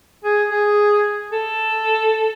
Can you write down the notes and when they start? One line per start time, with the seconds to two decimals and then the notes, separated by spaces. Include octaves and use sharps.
0.24 G#4
0.51 G#4
1.32 A4